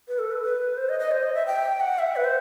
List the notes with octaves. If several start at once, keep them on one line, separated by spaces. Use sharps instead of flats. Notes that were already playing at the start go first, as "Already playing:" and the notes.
B4
A4
B4
B4
C5
D#5
D#5
C5
D#5
E5
G5
F#5
E5
B4
C5